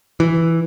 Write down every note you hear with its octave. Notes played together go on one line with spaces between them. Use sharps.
E3